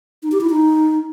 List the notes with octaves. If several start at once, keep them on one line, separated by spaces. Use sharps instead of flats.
D#4
G4
E4
D#4